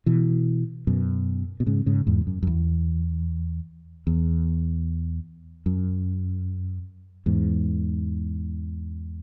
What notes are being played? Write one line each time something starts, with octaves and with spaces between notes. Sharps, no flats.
B2 E3
F#2 B2
B2
G#2 C#3
G#2 C#3
E2 G#2
F#2
F#2
E2
E2
F#2
E2 G#2